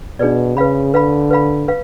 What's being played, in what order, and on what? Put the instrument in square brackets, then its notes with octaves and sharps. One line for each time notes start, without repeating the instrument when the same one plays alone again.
[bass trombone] B2 [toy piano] D4 G#4 B4 D5
[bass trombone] C#3 [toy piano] B4 F5 B5
[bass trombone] D3 [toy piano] B4 F5 B5
[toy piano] B4 F5 B5
B4 F5